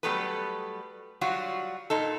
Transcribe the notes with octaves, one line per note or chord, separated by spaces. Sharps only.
F#3 G3 A3 B3 A4 B4
F#3 G3 F4 F#4
A#2 D#4 A4